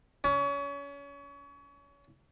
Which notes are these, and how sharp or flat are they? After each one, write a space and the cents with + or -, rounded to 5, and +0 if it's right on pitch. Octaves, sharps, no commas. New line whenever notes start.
C#4 +30